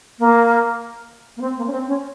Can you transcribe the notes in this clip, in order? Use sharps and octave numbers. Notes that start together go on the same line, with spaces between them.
A#3
A#3
C4
A#3
C#4
C4
C#4